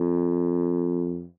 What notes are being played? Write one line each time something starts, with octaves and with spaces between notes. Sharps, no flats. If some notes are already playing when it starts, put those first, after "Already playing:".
Already playing: F2